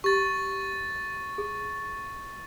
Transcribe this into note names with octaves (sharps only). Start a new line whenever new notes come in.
G4 C#6 A6
G#4